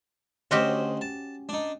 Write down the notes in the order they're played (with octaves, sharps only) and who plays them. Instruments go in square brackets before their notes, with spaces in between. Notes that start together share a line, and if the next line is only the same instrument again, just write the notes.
[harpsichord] D2 C5 D#5 [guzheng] C#4 F#4 G4
[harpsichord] A5
D4 D#4